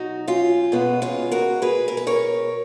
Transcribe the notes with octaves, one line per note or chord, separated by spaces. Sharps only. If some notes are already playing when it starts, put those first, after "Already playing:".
Already playing: B2 F#3 D#4 F#4
C#4 F4
B2 G#3 B3
C#4 F4
F#4 A#4
G#4 B4
A#4
B4
A#4 C#5